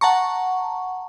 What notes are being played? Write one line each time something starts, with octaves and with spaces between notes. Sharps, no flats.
F#5 A5 A#5 C#6